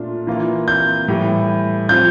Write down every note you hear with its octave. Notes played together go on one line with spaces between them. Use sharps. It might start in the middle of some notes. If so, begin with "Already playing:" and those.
Already playing: A#2 A3 D4 F4
E3 A#3 F4
G6
A2 E3 G3
F3 C4 F4 G6